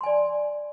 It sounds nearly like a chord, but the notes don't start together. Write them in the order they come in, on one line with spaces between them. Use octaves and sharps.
C6 G#5 D5